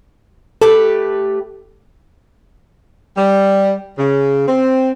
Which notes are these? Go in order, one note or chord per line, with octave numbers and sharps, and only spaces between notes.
A3 G4 A4 B4
G3
C#3
C4